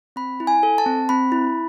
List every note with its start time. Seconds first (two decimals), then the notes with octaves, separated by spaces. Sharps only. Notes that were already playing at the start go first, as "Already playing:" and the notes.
0.16 C4 B5
0.40 E4
0.47 G#5
0.63 A4
0.78 A5
0.86 C4
1.09 C4 B5
1.32 E4